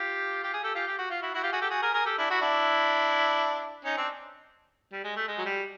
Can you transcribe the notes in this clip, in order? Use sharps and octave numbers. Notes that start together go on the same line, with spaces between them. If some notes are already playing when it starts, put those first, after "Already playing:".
Already playing: F4 G4
G4
G#4
G4 A4
F4 G4
G4
F#4
F4
E4 F#4
E4 F#4
F4 G4
F#4 G#4
G4 A4
F#4 G#4
G#4 A#4
G#4 A#4
G4 A4
D4 E4
E4 F#4
D4 E4
C#4 D#4
C4 D4
G3
G#3
A3
G#3
F#3
G3